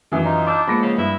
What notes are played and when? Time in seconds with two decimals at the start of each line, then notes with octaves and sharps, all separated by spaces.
0.12 F#2 D#3 E3
0.25 D#4 F4 D5 A#5
0.47 D4 D6 E6 G6
0.67 F3 G#3 A#3 B3 B5 A#6 C#7
0.82 C#3
0.98 G2 E4